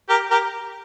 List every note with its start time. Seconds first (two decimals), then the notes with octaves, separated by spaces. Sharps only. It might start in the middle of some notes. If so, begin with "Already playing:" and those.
0.09 G4 A#4
0.30 G4 A#4